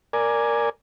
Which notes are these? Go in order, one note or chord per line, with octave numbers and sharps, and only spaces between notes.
A#4 D5 G#5